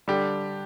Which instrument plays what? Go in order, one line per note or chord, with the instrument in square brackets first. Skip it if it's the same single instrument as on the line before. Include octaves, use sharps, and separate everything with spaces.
[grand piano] D3 G3 D4 G4